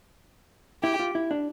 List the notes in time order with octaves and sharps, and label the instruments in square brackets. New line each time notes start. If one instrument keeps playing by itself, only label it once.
[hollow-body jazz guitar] E4 [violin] G4
[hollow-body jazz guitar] F4
E4
D4